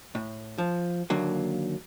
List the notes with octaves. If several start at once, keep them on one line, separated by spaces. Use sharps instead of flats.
A2
F3
D#2 D3 F#3 A#3